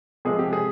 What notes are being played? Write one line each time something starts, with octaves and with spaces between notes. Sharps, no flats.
C3 F3 G#3 G#4
G4
G#4